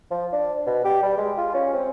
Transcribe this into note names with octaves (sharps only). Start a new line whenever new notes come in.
F3
D4
B2
G4
G3
G#3
F4
C#4
C4